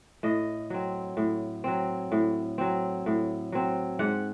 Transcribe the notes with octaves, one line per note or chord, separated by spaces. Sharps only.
A2 D#5
F#3 C4
A2
F#3 C4
A2
F#3 C4
A2
F#3 C4
G#2 F#5